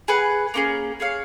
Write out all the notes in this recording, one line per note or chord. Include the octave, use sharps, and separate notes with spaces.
G#4 B4 F#5
A#3 C#4 F4 G#4
G#4 C#5 F5